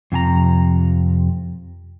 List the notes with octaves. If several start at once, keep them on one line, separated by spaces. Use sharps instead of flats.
F2 C3 G#5 A#5